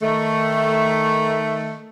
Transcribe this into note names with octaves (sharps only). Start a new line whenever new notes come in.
D#3 A3